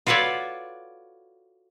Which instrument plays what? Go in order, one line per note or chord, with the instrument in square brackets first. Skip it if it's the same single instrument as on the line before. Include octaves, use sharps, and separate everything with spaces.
[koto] F4 F#4 A4 B4 C#5 D5